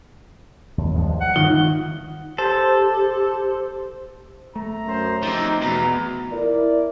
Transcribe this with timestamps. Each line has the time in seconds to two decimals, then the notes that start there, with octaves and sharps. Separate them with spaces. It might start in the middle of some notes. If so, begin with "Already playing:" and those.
0.78 D#2
0.95 G2 F3 G#3
1.21 F#5
1.36 D#3 D#4 F4
2.38 G4 A4 C5
4.56 A3 A#5
4.87 F#2 C5
5.23 F3 C4 D#4 G4
5.61 E2 B2 A#5
6.32 E4 A#4 D5